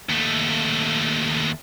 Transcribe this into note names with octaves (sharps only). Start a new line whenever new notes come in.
D#2 A3